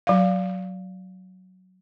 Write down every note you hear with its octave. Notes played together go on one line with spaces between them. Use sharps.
F#3 F5